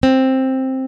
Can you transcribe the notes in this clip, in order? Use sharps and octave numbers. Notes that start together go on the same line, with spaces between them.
C4